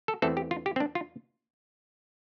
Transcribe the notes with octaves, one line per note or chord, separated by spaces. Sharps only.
A4
E2 E3 A3 C4 A4
G4
F4
G4
C4
D4
F4